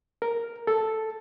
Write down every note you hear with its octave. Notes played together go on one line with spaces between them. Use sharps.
A#4
A4